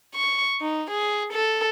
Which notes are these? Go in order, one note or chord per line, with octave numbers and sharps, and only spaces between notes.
C#6
D#4
G#4
A4